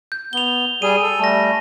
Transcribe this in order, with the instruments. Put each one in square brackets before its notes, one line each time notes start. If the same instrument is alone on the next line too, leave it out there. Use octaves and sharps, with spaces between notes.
[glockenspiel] G6
[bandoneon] B3 [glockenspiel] F7 G7
[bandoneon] G3 G#4 [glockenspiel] G#5 D#7
[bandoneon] A4
[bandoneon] G3 A3 [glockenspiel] A5 A#6